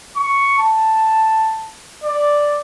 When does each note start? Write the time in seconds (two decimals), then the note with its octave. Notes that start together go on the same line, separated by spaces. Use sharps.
0.16 C#6
0.59 A5
2.04 D5